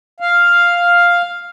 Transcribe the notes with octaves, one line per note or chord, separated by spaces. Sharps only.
F5